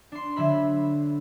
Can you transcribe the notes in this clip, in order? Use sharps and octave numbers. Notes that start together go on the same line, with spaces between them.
D4 C6
D3 F#3 E5 B5